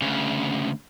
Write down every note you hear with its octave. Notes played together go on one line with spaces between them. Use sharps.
D2 C#3